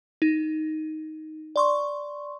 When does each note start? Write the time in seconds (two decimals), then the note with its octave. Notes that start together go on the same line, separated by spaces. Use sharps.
0.22 D#4
1.56 D5 C6 C#6